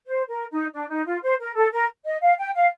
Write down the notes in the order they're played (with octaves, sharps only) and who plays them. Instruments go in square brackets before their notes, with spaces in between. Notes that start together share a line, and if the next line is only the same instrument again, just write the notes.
[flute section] C5
A#4
D#4
D4
D#4
F4
C5
A#4
A4
A#4
D#5
F5
G5
F5